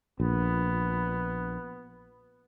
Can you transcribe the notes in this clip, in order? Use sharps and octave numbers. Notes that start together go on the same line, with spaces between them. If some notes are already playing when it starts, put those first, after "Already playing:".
A#1 B3